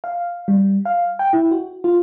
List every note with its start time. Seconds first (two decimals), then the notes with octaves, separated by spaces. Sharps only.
0.04 F5
0.48 G3
0.85 F5
1.19 G5
1.33 E4
1.51 F#4
1.84 F4